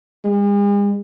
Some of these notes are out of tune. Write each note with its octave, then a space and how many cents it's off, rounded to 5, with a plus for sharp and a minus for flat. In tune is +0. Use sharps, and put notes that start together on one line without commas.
G#3 -45